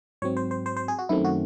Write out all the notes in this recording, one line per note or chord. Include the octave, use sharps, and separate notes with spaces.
G#2 F#3 C4 C#5
C5
C5
C5
C5
G#4
F#4
F#2 D#3 A3 C4 E4
F#4